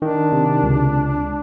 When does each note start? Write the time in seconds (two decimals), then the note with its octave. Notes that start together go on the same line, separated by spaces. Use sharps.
0.02 D#3 D4
0.32 C3
0.63 C#2